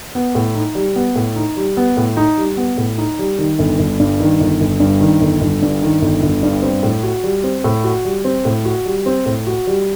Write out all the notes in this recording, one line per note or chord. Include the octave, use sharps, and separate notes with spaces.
B3
A2
D#4
G3
B3
A2
D#4
G3
B3
A2
D#4
G3
B3
A2
D#4
G3
D#3
G1
G1
G2
D#3
G1
G1
G2
D#3
G1
G1
G2
D#3
G1
G1
G2
C4
A2
F#4
G3
C4
A2
F#4
G3
C4
A2
F#4
G3
C4
A2
F#4
G3